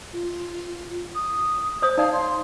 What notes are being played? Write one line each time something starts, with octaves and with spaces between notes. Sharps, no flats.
F4
D#6
C5 C#5 D#6
D#4 D5 F5 A5
C6